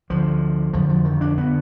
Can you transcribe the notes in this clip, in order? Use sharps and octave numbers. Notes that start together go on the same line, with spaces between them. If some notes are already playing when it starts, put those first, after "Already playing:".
D2 D3 F3
F2 D3 F3
F3
D#3
D4
D3 B3